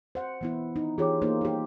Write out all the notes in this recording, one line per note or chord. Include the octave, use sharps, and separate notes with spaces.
C5 F#5
E3 B3 E4
D#4
E3 F4 G4 G#4 C#5 D6
A#3 D#4 C5
D#4 G4